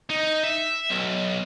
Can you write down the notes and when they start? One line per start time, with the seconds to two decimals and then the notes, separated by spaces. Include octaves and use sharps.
0.10 D#4
0.44 E5
0.90 B1